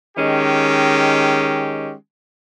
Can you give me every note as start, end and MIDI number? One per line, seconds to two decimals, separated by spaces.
0.18 1.94 51
0.18 1.94 56
0.18 1.94 61
0.18 1.94 67